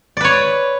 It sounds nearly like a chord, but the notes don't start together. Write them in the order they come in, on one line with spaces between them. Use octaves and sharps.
D5 B4 C#5